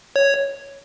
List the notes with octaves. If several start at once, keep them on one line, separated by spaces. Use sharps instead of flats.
C#5